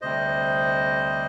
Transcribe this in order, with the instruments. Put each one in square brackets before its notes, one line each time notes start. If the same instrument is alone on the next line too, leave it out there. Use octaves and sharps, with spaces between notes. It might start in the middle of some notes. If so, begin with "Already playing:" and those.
[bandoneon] D2 C3 G3 C5 D#5